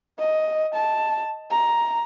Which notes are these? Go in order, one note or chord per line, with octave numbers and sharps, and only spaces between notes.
D#5
A5
A#5